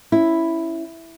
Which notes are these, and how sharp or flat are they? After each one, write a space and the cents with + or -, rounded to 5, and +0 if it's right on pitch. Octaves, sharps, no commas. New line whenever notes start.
C#4 +0 E4 +0